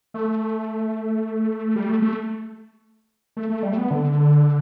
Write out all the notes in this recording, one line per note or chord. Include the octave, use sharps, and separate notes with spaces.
A3
G3
A3
A3
A3
A3
G3
A3
B3
D3